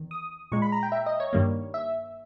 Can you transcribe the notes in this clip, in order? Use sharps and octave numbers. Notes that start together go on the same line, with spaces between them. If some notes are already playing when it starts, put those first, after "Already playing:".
Already playing: E2 D#3
D#6
A#2 G#3 C#6
B5
A#5
G5
E5
D#5
C#5
G2 D#3 G3 A#3
E5